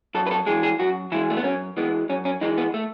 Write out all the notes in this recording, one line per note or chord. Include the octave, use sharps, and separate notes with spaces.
F#2 A4
B4
A4
E3 G#3 G#4
G#4
F#2 F#4
E3 G#3 E4
A3
B3
F#2 C#4
E3 G#3 B3
F#2 C#4
C#4
E3 G#3 D#4
B3
A3